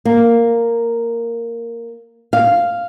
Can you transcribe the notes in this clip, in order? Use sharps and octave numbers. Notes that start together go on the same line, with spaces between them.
A#3
F5